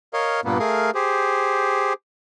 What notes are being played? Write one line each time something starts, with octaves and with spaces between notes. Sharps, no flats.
A#4 C#5 D#5 F5
G2 A#2 A#3 B3
A3 G#4 A#4 F5
G4 G#4 C5